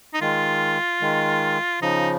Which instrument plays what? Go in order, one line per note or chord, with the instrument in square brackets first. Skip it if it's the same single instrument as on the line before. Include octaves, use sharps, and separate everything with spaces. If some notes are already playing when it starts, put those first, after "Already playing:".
[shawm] D#4
[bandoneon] D#3 G#3 [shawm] F4
[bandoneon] D#3 G#3
[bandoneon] C#3 F3 [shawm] D#4